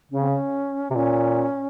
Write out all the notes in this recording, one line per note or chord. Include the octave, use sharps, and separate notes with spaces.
C#3 C#4
C4
C#4
C3
A#2 C#4